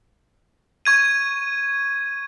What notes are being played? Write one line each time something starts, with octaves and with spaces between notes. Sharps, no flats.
C#6 G#6 D#7